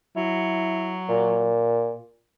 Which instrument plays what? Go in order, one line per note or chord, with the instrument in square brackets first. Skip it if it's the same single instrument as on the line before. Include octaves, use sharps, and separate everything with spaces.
[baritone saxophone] F#3 [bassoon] E4
[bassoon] A#2